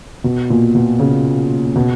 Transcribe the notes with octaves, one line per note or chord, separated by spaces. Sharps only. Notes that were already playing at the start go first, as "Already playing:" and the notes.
B2
A#2
B2
C#3
B2